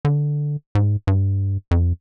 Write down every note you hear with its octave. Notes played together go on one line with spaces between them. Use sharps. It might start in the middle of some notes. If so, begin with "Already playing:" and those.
D3
G#2
G2
F2